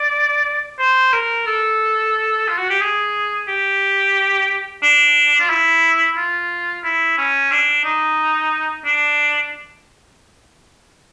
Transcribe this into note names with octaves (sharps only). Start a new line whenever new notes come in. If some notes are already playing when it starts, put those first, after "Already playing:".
Already playing: D5
C5
A#4
A4
F4
F#4
G4
G#4
G4
D4
F4
E4
F4
E4
C#4
D4
D#4
D4